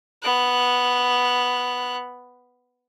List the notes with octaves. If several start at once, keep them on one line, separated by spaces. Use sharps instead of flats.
B3 F#6